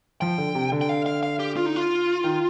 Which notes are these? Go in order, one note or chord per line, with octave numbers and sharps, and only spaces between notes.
F3 G5
D3
C3
D3
G5
F5
F5
F5
G4
F4
D#4
F4
D#3